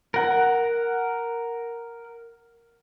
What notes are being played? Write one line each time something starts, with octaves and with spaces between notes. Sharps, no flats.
A#4 F#5